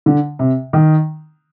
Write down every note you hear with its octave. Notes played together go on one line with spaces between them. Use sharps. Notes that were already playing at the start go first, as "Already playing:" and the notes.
D3
C3
D#3